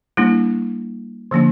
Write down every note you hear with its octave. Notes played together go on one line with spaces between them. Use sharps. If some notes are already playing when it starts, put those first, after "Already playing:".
G3 A#3 D4 E4
D3 F3 A#3 D4